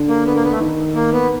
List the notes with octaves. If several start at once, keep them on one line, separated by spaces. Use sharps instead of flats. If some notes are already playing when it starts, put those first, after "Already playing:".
Already playing: D3
A#3
B3
A#3
B3
A3
D#3
A#3
B3